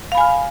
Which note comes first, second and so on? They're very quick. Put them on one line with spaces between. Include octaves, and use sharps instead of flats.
F5 B5 G#5 F6